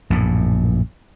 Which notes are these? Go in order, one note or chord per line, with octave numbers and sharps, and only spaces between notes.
A#1 F#2 A2